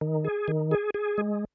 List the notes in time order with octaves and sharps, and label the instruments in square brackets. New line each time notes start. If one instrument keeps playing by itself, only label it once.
[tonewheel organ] D#3
G#4
D#3
G#4
G#4
G#3